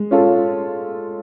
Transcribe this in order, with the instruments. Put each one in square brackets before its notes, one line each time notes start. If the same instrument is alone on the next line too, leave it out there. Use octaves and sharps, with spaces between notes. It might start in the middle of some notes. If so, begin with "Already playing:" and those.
Already playing: [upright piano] G#3
C#4 F4 A4